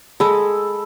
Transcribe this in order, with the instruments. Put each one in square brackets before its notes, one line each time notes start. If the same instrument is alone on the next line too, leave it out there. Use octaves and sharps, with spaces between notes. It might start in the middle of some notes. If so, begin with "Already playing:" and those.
[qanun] G#3 G#4 [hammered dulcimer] A4 B5